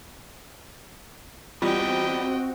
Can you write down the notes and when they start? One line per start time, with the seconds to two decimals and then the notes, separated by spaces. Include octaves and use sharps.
1.62 E2 G3 C4 F4 F#4 D#5 G5